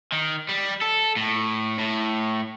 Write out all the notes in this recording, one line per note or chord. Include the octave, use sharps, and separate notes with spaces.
D#3
G3
A4
A2
A2